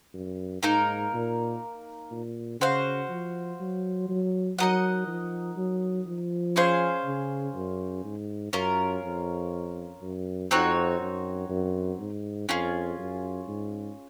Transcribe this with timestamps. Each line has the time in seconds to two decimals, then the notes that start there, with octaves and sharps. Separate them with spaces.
0.14 F#2
0.63 G#2 A#3 D#4 A#4
1.13 A#2
2.11 A#2
2.60 C#3 F#4 C5 F5
3.10 F3
3.60 F#3
4.09 F#3
4.58 F#3 D#4 A#4 D#5 F#5
5.07 F3
5.57 F#3
6.07 F3
6.56 C#4 G#4 C5 F5
7.05 C#3
7.55 F#2
8.04 G#2
8.53 F#2 C#4 F4 A#4
9.03 F2
10.02 F#2
10.51 F2 C4 D#4 F#4 C#5
11.01 F#2
11.49 F#2
12.00 G#2
12.49 F2 C#4 F4 G#4
12.98 F#2
13.48 G#2